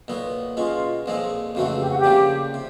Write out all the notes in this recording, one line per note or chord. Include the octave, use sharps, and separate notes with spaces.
B1 A#2 F#3 B3
B2 G#3 C#4 F4
B1 A#2 F3 G#3 C4
F2 C#3 E3 A3 C4 F#4
G4
F#4
G4
C#3 F3 A#3 D4
C3